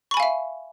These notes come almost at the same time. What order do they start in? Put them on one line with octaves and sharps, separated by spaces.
C#6 B5 G#5 F5 E5